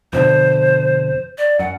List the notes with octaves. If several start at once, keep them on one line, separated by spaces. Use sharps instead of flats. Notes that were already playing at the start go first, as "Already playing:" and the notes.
F2 B2 D3 C5
D5
F#2 F#5